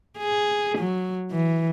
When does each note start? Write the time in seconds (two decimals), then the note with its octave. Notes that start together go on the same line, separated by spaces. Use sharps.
0.18 G#4
0.78 F#3
1.31 E3